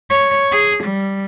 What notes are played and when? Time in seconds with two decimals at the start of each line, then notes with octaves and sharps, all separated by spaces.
0.10 C#5
0.52 G#4
0.84 G3